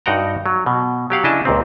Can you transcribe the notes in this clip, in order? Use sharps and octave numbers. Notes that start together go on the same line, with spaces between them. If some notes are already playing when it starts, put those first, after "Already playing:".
G2 D#4 F#4 F#5 G5 A#5
F#3
B2
F#3 G4 F5 F#5
C#3 D4 E4 D#5 A5
C#2 A#2 C4